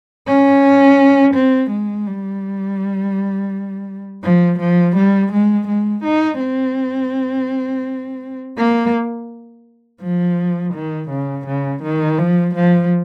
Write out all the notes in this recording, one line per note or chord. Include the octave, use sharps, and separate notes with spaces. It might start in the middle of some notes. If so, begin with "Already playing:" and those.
C#4
C4
G#3
G3
F3
F3
G3
G#3
G#3
D#4
C4
A#3
F3
D#3
C#3
C#3
D#3
F3
F3